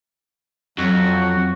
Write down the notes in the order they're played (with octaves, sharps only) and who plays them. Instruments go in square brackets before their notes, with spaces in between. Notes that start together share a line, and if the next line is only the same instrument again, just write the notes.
[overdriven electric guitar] F2 [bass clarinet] F#3 [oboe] F#4